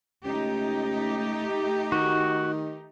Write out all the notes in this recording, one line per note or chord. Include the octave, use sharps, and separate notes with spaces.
C#2 A3 D#4 G4
D#3 F#4